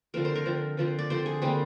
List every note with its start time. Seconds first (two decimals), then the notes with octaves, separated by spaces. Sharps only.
0.14 D3 F3 C4 A#4
0.25 C5
0.35 A#4
0.46 D3 F3 C4
0.77 D3 F3 C4
0.99 D5
1.10 D3 F3 C4 C5
1.26 G#4
1.42 D3 G3 A#3 C4